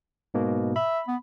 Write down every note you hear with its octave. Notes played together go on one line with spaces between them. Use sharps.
G#2 B2 A#3
E5 B5
B3